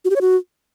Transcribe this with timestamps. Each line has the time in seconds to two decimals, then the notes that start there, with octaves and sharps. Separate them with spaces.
0.05 F#4
0.10 G4
0.16 C#5
0.21 F#4